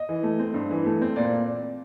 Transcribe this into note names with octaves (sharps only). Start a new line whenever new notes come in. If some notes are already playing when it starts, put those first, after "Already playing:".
Already playing: D#5
E3
A3
C4
G2
E3
A3
C4
A#2 D5